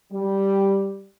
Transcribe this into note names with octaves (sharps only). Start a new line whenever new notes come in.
G3